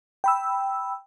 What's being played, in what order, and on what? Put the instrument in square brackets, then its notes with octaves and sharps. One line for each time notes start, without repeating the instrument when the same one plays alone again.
[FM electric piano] G5 B5 E6